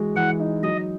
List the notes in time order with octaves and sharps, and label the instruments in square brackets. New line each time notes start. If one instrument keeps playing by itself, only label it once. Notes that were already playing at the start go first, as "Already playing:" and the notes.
Already playing: [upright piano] E3 G#3 F#4
[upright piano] E3 [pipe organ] F#5
[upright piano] D#4
[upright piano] F#3 [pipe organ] D#5